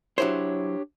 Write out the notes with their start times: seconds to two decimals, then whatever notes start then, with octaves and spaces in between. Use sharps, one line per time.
0.18 F#3 D4 E4 G4 C5 C#5